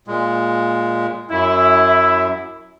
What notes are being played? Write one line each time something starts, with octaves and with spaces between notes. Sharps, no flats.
A#2 G#3
F#2 E4